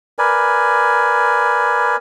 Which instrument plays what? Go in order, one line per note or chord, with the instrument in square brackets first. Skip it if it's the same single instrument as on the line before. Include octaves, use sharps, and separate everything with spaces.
[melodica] A#4 B4 D5 G#5